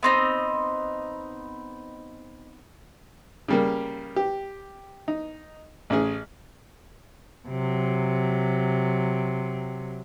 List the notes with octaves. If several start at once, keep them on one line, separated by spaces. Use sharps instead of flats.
B3 C4 D#4
C#3 G3 A#3
G4
D#4
A1 C#4 G#4
C3 F#3